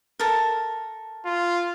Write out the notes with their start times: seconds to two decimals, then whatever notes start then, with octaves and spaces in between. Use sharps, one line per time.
0.20 A4 A#4
1.26 F4